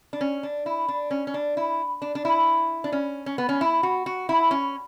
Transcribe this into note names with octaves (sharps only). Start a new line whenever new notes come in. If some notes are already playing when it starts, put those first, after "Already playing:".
D4
C#4
D4
E4
D4
C#4
C#4
D4
E4
D4
D4
E4
D4
C#4
C#4
B3
C#4
E4
F#4
F#4
E4
C#4